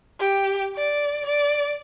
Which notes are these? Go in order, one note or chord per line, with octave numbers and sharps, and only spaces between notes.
G4
D5
D5